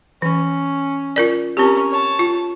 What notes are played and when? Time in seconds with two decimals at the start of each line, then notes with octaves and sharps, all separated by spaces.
0.22 E3 C#4
1.16 F4 A#4 D5
1.57 C4 C#4 G4 A#4
1.90 C#5 A5
2.19 F4